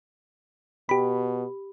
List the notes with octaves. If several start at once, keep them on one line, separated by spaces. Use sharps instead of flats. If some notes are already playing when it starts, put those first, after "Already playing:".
B2 G4 B5